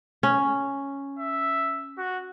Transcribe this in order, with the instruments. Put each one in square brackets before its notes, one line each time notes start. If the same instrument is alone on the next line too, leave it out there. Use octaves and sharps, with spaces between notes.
[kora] C#4
[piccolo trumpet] E5
F#4